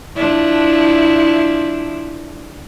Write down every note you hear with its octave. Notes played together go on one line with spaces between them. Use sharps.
F3 D4 E4